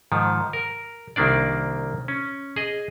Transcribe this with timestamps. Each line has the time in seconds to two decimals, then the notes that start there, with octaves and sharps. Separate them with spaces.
0.12 G#2 D#3 F3
0.53 A#4
1.16 C2 D#3 A#3 D4 D5
2.08 C#4
2.56 G#4 D#5